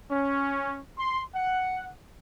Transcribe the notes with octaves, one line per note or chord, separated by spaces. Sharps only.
C#4
C6
F#5